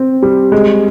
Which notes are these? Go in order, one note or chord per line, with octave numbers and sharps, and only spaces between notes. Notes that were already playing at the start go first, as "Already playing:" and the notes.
Already playing: C4
G3
G#3